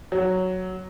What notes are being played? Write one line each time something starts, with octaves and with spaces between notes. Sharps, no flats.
F#3